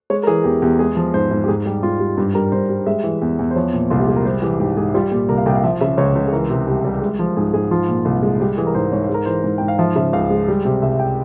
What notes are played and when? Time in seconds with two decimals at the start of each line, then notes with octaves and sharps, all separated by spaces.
0.10 G#3 C#5
0.23 A#4
0.27 E3 G#4
0.44 E2 G4
0.62 E2 G4
0.79 G#3 G#4
0.97 F3
1.14 G#2 C5
1.31 G#2
1.44 G4
1.48 G#2 G#4
1.66 G3 G4
1.83 G#2 F4
2.00 G3
2.17 G2 G4
2.35 G3 A#4
2.52 G2 C5
2.69 G3
2.86 G#3 E5
3.04 E3
3.22 E2
3.39 E2
3.51 C5
3.56 F3 C#5
3.74 A#2
3.90 C2 F4
3.99 G4
4.08 G#3 G#4
4.16 A#4
4.25 G3 C5
4.42 E3 G4
4.60 G#2 G4
4.77 G#2 G#4
4.94 G3 F4
5.12 A#2 G4
5.29 C2 A#4
5.37 F5
5.46 C2 G5
5.55 F5
5.64 F3 E5
5.81 C#3 E5
5.97 C#2 C#5
6.15 C#2
6.27 G#4
6.33 E3 A#4
6.50 C3
6.67 C2 G4
6.85 G3
7.02 G#3
7.19 F3
7.36 G#2 G#4
7.54 G#2 G#4
7.71 F3 F4
7.89 A#2
8.05 C2
8.23 G#3
8.40 G3 G4
8.58 E3 G#4
8.67 A#4
8.75 G#2 C5
8.92 G#2 C#5
9.03 C5
9.09 G#3 A#4
9.26 E3 C5
9.44 G#2
9.58 G#2 G5
9.68 F5
9.78 F3 E5
9.96 C#3 E5
10.13 C#2 F5
10.30 G#3
10.48 G3
10.65 C3
10.82 C2 E5
10.99 G5